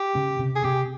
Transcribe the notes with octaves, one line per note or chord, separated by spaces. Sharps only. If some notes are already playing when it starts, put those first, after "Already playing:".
Already playing: G4
C#3 C#4
C3 C4
G#4
C3 C4 G4